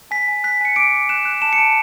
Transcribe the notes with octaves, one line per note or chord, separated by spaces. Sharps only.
G#5 B6
G#5
F#6 B6
G#5 C#7
D6 D7
D6
F#6 E7
F#6
A5 E7
C#7
A5 D7